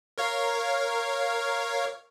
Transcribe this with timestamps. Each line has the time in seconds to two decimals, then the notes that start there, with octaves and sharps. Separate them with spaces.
0.18 A#4 C#5 F5